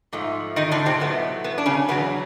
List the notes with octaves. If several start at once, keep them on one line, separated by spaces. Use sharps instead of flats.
G#2 F3 A3
D#3 D#4
D3 D4
C3 C4
A2 F#3 A3 B3
B3
D4
C#3 C#4
E2 C#3 F#3 B3